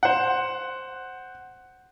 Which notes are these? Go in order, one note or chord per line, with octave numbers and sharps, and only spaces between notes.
C5 F#5